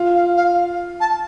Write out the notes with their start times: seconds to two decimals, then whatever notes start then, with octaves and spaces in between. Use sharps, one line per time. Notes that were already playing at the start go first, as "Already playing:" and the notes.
Already playing: F4
0.14 F5
0.36 F5
1.00 A5